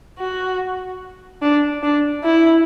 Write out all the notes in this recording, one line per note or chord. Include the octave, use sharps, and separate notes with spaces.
F#4
D4
D4
E4